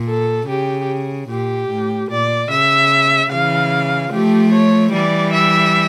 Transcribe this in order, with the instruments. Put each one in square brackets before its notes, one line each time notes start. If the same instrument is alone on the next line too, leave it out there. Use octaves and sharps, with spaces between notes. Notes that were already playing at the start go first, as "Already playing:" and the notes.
Already playing: [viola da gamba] A#2
[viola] A4
[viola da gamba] C#3 [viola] G4
[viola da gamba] A#2 [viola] G4
[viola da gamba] A2
[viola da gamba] A#2 [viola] D5
[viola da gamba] C#3 [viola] E5
[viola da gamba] C#3 E3 [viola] F5
[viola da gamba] F3 A3 [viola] G4
[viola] C#5
[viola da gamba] E3 G3 [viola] D5
[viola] E5